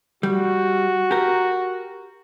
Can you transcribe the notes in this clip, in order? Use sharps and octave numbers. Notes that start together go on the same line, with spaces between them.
G3 F#4
G4 A#4